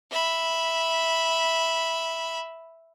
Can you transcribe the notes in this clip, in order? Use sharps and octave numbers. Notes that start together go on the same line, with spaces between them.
E5 B5